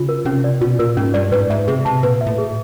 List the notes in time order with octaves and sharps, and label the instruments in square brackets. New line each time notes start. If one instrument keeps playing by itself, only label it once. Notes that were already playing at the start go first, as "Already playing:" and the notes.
Already playing: [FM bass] C#3 [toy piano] F4
[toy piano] A#4
[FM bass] C3 [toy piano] C#4
[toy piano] D5
[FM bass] B2 [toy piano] F4
[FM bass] A#2 [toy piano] A#4
[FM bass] G#2 [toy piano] C#4
[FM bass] G2 [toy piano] D5
[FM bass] G#2 [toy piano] B4
[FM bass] G#2 [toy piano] E5
[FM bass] C3 [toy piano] G#4
[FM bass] C3 [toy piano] A5
[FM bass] A#2 [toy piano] B4
[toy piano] E5
[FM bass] A2
[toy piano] G#4